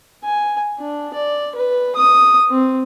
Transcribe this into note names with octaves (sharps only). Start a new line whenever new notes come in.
G#5
D4
D5
B4
D#6
C4